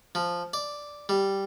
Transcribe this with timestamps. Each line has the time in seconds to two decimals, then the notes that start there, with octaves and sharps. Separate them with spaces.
0.15 F3
0.53 D5
1.09 G3